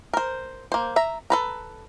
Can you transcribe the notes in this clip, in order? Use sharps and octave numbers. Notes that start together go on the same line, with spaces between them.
A#4 C5
A#3 C5
E5 A#5
A4 B4 A#5